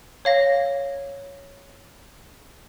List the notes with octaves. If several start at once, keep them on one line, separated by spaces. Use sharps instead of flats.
C#5 F5 A#6